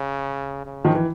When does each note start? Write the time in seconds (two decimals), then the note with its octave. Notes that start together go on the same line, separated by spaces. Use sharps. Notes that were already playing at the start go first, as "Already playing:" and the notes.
Already playing: C#3
0.66 C#3
0.85 D#3 F3
0.95 E3